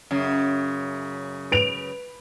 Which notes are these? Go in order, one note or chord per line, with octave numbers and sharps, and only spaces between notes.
F#2 C#3
B4 D7 F7